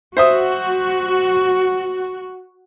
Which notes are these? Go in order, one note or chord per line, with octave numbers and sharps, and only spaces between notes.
F#4 C5 E5 D#6